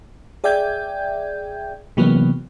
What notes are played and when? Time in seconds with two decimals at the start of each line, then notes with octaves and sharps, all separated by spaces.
0.44 G#4 D5 E5 G5 G6 G#6
1.97 C3 E3 F#3 G#3 A#3 B3